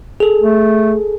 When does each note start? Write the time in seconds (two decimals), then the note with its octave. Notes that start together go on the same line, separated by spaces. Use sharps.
0.20 G#4 A4
0.41 A3